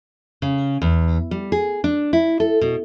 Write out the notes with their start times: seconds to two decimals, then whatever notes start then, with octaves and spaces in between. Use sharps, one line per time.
0.42 C#3
0.82 E2
1.31 G3
1.52 G#4
1.84 D4
2.13 E4
2.40 A4
2.61 B2